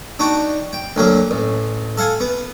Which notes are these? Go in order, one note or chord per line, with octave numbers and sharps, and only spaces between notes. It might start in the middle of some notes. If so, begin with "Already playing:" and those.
D4 D#4 F#4 G5
G5
D2 F#3 A#3
A1
A4 F5 F#5 G#5
B3